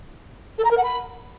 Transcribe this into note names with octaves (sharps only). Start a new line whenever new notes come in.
A4
A#5
A#4
F#5
B5